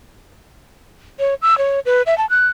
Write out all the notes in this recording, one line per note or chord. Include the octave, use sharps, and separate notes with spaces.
C#5
E6
C#5
B4
E5
A5
F#6